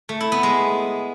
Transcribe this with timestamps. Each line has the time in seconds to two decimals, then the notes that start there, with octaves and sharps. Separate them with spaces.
0.09 A3
0.20 E4
0.32 B3
0.43 G#3